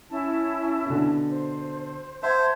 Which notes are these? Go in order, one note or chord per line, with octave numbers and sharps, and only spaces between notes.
C#4 E4 A5
B2 D3
C5
C5 E5 F#5 A5 G#6